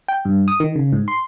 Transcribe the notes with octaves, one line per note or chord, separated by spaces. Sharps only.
G5
G2
D#6
D#3
C#3
G#2
C6